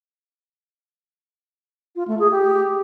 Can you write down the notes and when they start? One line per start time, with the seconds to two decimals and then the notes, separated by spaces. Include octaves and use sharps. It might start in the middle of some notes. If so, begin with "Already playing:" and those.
1.96 F4
2.08 A3
2.19 G#4
2.31 G4